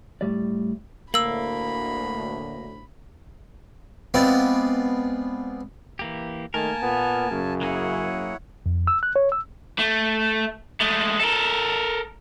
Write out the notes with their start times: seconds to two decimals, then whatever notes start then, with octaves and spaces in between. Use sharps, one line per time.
0.21 A2 G3 D5
1.14 D2 A2 A#3 B5 E6 F#7
4.14 G#3 B3 C4 F4 D5
5.99 E3 A#3 G4
6.54 D#3 A3 A#3 A#4 G#5 A5
6.83 A#2 B3
7.31 F#2 C#3
7.61 F#3 A#3 E4 G#4 C#5 F#5
8.66 F2
8.87 E6
9.03 F#6
9.16 C#5
9.32 E6
9.79 A3
10.81 G#3 A3
11.20 A4 A#4